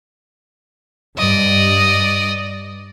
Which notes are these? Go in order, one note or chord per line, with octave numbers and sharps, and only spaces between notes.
G2 D5 D#5